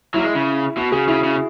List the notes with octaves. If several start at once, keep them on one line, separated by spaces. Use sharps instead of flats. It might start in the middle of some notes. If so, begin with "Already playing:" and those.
F#3 E4
A#3
G#3
C#3
B2 F#4
C#3 G#4
C#3 E4
C#3